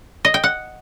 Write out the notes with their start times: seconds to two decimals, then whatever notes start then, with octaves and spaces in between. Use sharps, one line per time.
0.25 D#5
0.34 G5
0.44 F#5